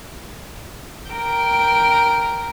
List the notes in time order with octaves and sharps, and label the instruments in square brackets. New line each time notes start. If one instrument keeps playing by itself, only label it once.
[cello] A#4 G5